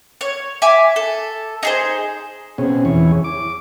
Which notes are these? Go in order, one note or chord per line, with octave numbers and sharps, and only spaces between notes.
C#5
E5 G#5 D6
A4
D#4 G#4 C5
B2 C4 C#4 G#4
E2 E3 G#4 C#5
D6